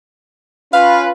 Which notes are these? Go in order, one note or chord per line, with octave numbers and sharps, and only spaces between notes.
C#4 F4 B4 F5